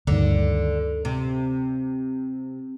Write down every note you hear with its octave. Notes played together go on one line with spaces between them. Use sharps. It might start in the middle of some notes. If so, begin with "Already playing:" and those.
D2 G2 D3 D#3
C3